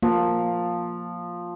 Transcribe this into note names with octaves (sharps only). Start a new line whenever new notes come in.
F3 A#3